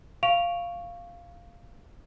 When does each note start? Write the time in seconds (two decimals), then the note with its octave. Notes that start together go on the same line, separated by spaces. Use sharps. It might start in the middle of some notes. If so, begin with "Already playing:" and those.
0.23 F5 C#6 D7 F7